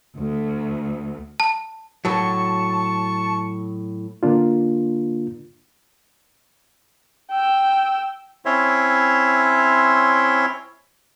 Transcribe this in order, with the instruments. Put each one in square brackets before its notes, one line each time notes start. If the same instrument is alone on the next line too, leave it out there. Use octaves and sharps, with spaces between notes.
[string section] D2
[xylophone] A5
[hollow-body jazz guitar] A2 F#3 [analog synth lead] A5 [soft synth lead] C#6
[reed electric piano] D3 A#3 D4 F4
[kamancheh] G5 E6
[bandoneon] C4 C#4 E4 C#5 E5 C6